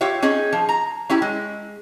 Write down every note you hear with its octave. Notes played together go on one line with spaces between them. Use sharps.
F4 G4 C#5 E5
C#4 D#4 G#4
F3
A#5
C#4 E4 G4
G#3